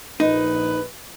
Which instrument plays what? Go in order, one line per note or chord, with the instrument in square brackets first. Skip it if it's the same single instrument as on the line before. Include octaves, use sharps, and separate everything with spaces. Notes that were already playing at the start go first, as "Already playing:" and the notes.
[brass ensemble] A#1 B4 [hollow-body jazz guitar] D#4